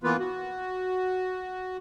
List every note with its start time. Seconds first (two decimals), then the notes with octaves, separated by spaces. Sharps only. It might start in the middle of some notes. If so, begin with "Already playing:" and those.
0.04 E3 A#3 B3 F4 B4
0.19 F#4